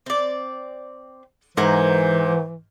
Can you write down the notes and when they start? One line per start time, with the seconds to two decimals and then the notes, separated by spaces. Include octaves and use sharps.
0.06 C4 D5
1.57 G#2 E3 A#4 C5 F#5 G#5